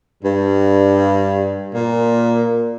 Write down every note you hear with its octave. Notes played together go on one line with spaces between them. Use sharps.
G2
A#2